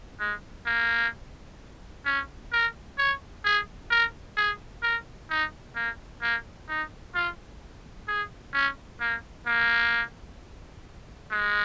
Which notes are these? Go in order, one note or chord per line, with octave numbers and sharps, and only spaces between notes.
G#3
A#3
C#4
A#4
C#5
G#4
A#4
G#4
A#4
D#4
A#3
A#3
D#4
F4
G#4
C#4
A#3
A#3
G#3